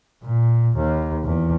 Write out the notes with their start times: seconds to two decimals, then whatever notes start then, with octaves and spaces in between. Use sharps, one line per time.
0.23 A#2
0.76 D#2
1.24 E2